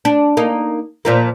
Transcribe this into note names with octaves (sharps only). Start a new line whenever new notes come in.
D4
A#3 D#4
A#2 F3 A#3